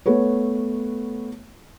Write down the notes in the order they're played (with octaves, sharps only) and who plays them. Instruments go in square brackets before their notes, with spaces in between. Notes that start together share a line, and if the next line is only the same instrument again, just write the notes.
[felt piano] A3 B3 B4 C#5